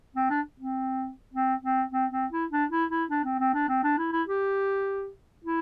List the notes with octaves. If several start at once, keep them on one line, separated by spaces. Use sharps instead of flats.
C4
D4
C4
C4
C4
C4
C4
E4
D4
E4
E4
D4
C4
C4
D4
C4
D4
E4
E4
G4
E4